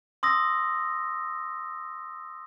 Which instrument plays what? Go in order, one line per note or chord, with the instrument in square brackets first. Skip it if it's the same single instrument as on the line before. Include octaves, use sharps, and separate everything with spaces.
[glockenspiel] C6 D#6 E6 A#6